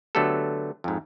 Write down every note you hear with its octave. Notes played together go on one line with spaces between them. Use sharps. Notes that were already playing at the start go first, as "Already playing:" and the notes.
D3 F#3 A3 B3 G4 A4
F2 G#2